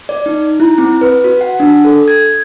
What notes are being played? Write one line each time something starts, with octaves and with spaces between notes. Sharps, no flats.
D5
D#4
E4
C4
B4
F#4
F#5
D4
A4
G#6